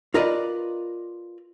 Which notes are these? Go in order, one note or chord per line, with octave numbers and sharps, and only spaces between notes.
F4 A#4 B4 D5 D#5